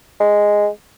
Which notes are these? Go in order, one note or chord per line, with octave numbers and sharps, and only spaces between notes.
G#3